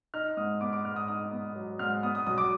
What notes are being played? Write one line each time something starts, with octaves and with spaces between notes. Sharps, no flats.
D#4 F6
G#2 D#6
B3 D6
D6
G#2 F6
D#6
D#4 D#6
B3
F#3
G#2 F6
B3 D#6
D#6
B1 D#6
D6